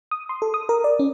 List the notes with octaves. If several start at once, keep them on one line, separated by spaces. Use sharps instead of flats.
D#6
C6
A4
D#6
A#4
D5
C#4